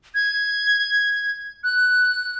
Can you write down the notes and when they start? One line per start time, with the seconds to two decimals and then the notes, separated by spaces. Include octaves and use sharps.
0.15 G#6
1.64 F#6